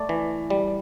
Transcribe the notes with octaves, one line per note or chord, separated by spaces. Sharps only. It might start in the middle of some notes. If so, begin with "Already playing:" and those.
Already playing: A3 D5
E3
G3